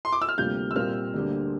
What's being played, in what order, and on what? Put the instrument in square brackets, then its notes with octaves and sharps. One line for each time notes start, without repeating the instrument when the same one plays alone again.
[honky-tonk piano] C6
D6
E6
F6
[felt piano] D2 C3 G3 A#3 F4 [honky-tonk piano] G6
[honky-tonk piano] E6
[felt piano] A#2 G3 C4 F4 A#4 [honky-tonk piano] F6
[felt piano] D2 D3 G3 A#3